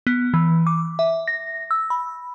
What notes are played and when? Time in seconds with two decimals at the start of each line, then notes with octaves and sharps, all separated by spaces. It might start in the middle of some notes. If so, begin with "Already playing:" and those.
0.07 B3
0.34 E3
0.67 D6
0.99 E5
1.28 A#6
1.71 E6
1.90 B5